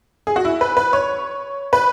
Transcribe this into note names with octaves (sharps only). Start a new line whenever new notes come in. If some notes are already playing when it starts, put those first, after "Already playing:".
G#4
F#4
E4
B4
B4
C#5
B4